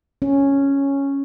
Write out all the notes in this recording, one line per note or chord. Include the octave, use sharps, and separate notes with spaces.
C#4